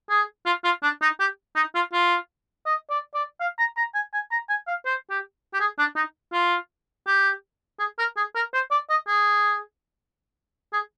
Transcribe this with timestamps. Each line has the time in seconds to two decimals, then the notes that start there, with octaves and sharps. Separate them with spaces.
0.10 G#4
0.46 F4
0.64 F4
0.83 D4
1.02 D#4
1.20 G4
1.56 D#4
1.75 F4
1.93 F4
2.66 D#5
2.90 D5
3.15 D5
3.40 F5
3.59 A#5
3.77 A#5
3.94 G#5
4.13 G#5
4.31 A#5
4.49 G#5
4.67 F5
4.86 C5
5.11 G4
5.54 G4
5.60 G#4
5.79 D4
5.96 D#4
6.32 F4
7.07 G4
7.79 G#4
7.99 A#4
8.17 G#4
8.35 A#4
8.54 C5
8.71 D5
8.90 D#5
9.08 G#4
10.73 G#4